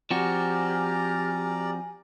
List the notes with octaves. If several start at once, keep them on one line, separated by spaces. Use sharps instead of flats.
F3 C4 F#4 G4 D5 G#5 A#5 F6